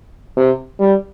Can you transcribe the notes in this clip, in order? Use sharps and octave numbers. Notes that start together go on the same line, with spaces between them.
C3
G3